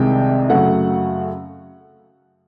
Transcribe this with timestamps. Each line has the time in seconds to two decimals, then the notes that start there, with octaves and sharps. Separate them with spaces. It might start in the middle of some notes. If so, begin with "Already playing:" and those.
Already playing: C2 C3 D#3 G#3 G5
0.49 F#2 C#3 F#3 A3 F#5